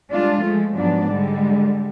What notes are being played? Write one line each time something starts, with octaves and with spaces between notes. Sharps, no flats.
G3 G#3 D4 F4
F3 G#3 A3
G#2 F3 F#3 B3 D4
D3 G3 G#3